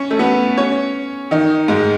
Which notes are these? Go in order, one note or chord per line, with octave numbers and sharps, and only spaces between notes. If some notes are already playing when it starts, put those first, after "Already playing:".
Already playing: C#4 C#5
A3 A4
B3 B4
C#4 C#5
D#3 D#4
G#2 G#3